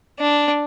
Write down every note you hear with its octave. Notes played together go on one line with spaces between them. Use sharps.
D4